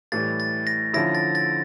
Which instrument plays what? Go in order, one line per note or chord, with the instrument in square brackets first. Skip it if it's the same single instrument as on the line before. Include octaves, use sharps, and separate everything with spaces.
[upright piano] A2 E3 G3 [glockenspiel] A6
[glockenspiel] A6
A#6
[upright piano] D3 F3 C#4 E4 [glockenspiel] A#6
[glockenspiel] A6
A6